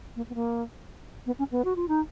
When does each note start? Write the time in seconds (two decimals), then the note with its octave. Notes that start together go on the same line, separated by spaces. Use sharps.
0.16 A#3
0.30 B3
0.35 A#3
1.26 B3
1.39 C#4
1.51 B3
1.65 F#4
1.76 F4
1.88 D#4